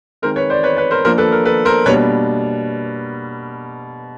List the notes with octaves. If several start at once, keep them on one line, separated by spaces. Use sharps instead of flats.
D#3 G#3 C4 A#4 C5
B4 C#5
C5 D5
B4 C#5
B4 C#5
A#4 C5
F3 A#3 D4 A#4 C5
A4 B4
A#4
A4 B4
A#4 C5
B2 G3 A#3 D4 B4 C#5